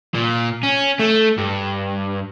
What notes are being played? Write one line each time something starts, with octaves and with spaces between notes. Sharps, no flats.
A#2
C#4
A3
G2